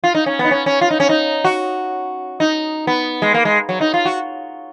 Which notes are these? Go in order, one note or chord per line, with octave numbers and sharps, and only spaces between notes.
F4
D#4
C#4
B3
D#4
C#4
C#4
F4
D#4
C#4
D#4
F#4
D#4
B3
G#3
A#3
G#3
F#3
D#4
F4
F#4